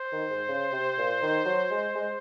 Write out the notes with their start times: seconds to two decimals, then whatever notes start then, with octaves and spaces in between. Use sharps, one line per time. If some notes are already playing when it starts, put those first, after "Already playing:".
Already playing: C5
0.12 D#3
0.30 G#2
0.48 C#3
0.72 C3
0.98 A#2
1.22 D#3
1.45 F#3
1.71 G#3
1.95 G#3